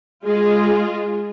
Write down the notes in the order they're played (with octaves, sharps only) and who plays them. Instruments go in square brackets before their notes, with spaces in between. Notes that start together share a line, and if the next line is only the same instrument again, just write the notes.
[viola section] G#3 F4 G#4